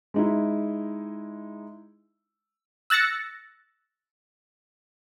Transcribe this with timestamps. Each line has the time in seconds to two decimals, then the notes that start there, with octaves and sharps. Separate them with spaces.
0.14 G#3 D#4 E4
2.90 E6 F#6 A6 A#6 C#7